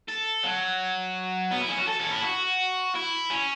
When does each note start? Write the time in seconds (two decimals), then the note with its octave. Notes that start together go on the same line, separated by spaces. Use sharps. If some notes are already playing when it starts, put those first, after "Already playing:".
0.08 A4
0.43 F#3
1.51 B3
1.61 E4
1.69 C#4
1.78 F#4
1.88 A4
2.00 C#4
2.12 E4
2.23 F#4
2.95 E4
3.30 C#4